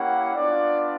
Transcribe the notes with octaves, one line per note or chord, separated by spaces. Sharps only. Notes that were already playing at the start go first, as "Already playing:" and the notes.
Already playing: A#3 C#4 E4 G4 F#5
B3 D4 F4 D5